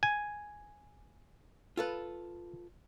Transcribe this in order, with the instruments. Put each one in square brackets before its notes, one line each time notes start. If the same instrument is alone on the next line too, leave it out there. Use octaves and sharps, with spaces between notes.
[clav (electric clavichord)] G#5
[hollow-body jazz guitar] F4 A4 B4